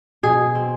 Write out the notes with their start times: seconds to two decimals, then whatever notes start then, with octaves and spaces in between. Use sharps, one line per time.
0.23 B2 G#4
0.55 C4